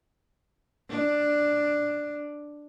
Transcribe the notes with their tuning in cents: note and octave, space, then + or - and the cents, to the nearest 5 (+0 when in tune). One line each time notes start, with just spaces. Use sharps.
D4 +5